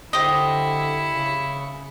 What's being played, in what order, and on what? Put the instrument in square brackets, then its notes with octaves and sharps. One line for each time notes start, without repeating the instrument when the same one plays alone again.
[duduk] D3 [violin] E4 C#7 [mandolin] G4 C5 D#5
[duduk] C#3